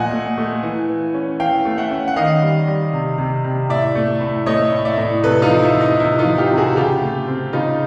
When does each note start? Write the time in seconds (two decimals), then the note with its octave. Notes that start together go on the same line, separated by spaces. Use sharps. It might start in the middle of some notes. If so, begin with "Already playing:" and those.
Already playing: A#2 F3 A3 D#5 F#5 G#5
0.12 A3
0.38 A3
0.63 E3
0.89 E3
1.14 C#4
1.40 E3 F5 G5
1.65 A3
1.78 E5 F#5
1.91 C#4
2.08 F#5
2.16 D#3 D#5 F5
2.42 G3
2.67 G3
2.93 C3
3.18 C3
3.44 C3
3.69 A2 D5 E5
3.95 A3
4.21 A2
4.46 A3 C#5 D#5
4.72 A2
4.85 D5 E5
4.98 A2
5.23 C3 A4 B4
5.42 D#4 F4
5.49 F3
5.62 E4
5.74 F3
5.81 D#4
5.99 C3 E4
6.19 D#4 F4
6.25 F3
6.38 F4 G4
6.51 C3
6.57 F#4 G#4
6.76 C#3 F4 G4
7.02 A3
7.27 C4
7.53 C#3 D#4 F4